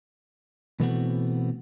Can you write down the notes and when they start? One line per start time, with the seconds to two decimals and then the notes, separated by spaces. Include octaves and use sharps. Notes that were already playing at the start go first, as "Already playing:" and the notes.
0.80 B2 E3 A3 B3 C4 F#4